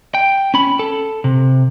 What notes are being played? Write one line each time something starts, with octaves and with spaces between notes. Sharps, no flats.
G5
C#4 B5
A4
C3